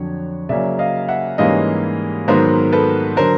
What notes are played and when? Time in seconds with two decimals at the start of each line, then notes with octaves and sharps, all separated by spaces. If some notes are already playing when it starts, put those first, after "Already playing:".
Already playing: F2 D3 F#3 C#5
0.49 C#3 F#3 A#3 C#4 D5 E5
0.79 D#5 F5
1.08 E5 F#5
1.38 G#2 E3 G3 A#3 C#4 D#5 F5
2.28 G#2 D#3 F#3 B3 A#4 C5
2.72 A4 B4
3.17 D3 F#3 A#4 C5